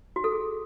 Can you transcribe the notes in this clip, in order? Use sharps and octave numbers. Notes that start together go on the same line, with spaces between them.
F#4
A4
G#4